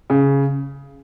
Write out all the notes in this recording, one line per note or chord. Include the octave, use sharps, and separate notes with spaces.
C#3